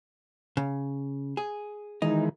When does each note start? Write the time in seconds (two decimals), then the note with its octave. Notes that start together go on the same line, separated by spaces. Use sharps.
0.57 C#3
1.37 G#4
2.02 D#3 E3 G#3 D#4